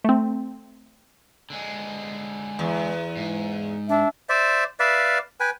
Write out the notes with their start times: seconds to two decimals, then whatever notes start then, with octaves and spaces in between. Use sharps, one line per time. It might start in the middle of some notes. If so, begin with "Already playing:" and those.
0.04 A3 C4
1.50 D3 G#3
2.59 E2
3.16 G#2
3.89 D4 E5
4.29 C5 D5 E5
4.80 B4 D5 E5 F5
5.40 B4 G5 G#5